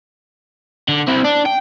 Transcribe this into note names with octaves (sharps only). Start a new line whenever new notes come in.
D3
C4 E4
D4
G5